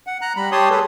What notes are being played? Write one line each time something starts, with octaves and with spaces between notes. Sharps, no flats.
F#5
A#5 F#6
G3 B5
G4 C#5 A5 C6 D#6
G#4 A4 B4